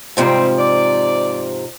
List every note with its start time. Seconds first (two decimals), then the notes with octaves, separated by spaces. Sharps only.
0.17 G#2 C3 F3 G3 C4
0.59 D5